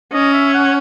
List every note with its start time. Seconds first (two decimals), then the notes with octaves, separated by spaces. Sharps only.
0.13 C#4 D#5
0.33 E5
0.54 F#5